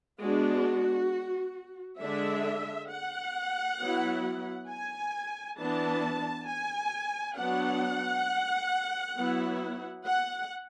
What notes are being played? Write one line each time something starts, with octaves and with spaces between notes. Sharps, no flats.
G#3 B3 D4 F#4
D3 G#3 D4 E5
F#5
F#3 B3 E4
G#5
E3 B3 D4 A5
G#5
F#3 B3 D4 F#5
F#3 B3 E4
F#5